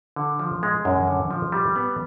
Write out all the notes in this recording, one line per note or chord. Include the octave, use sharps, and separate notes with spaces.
D3
F3
G#3
F#2
D3
F3
G3
B3